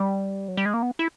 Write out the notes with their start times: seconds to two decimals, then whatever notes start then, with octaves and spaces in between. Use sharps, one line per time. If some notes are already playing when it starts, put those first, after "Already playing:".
Already playing: G3
0.48 F#3
0.57 G3
0.66 G#3
0.74 A#3
0.82 B3
0.99 E4